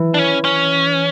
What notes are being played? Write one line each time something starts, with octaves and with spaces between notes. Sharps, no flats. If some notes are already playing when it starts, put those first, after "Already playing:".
Already playing: E3
D4
C#4
C#4